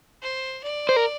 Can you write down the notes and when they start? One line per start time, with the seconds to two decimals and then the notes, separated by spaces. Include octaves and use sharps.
0.22 C5
0.63 D5
0.89 C5
0.96 A#4